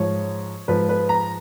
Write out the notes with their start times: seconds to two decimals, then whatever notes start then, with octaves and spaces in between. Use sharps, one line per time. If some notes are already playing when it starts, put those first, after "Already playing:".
Already playing: G#2 F3 C#5
0.68 G#2 F3 B4
0.89 B4
1.09 A#5